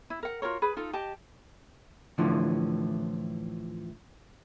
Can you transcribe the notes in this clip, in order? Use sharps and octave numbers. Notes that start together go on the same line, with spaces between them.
E4
A#4 F#5
F4 F#4 A#4 C#5
G#4 B4 B5
D#4 F4 A4
G4 D#5 A5
A2 D3 E3 F3